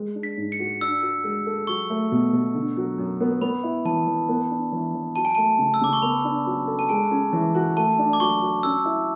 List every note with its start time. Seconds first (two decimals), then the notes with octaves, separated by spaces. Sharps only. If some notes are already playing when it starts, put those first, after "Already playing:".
Already playing: G#3
0.15 D4
0.23 B6
0.37 G#2
0.52 C#7
0.59 F#4
0.81 D4 E6
1.02 F#4
1.24 G#3
1.46 A4
1.67 F#3 C#6
1.90 A3
2.12 B2
2.33 B2
2.55 D3
2.77 F#3
2.98 F#2
3.21 B3
3.41 B3 B5
3.63 E4
3.85 E3 A5
4.07 E3
4.29 B3
4.51 D4
4.72 E3
4.94 E3
5.16 F#3 A5
5.25 G#5
5.35 A3 A5
5.59 C#3
5.74 E6
5.81 C#3 D6
5.93 C#6
6.02 B3 B5
6.24 D4
6.46 F#3
6.67 A4
6.79 A5
6.89 G#3 G#5
7.11 C#4
7.33 E3
7.54 F#4
7.77 A3 A5
7.98 D4
8.13 D6
8.20 F#3 C#6
8.41 F#3
8.63 C#4 E6
8.85 E4